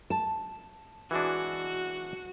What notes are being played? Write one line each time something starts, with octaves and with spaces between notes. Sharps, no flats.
A5
E3 G#3 D4 F#4